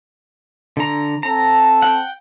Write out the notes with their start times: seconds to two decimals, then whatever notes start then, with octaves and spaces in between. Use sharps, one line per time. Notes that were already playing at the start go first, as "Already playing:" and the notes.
0.77 D3 A#5
1.23 C4 A4 A5 A#5
1.82 F#5 G5